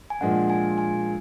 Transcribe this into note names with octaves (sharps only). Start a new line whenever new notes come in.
G#5
A#2 F3 G#3 D4 F#5
G#5
G#5